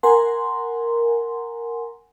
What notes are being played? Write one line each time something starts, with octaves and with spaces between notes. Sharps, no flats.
A#4 F#5 G#5 A#5 C6